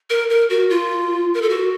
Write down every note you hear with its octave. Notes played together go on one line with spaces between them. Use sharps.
A#4
A#4
F#4
F4
A#4
A4
F#4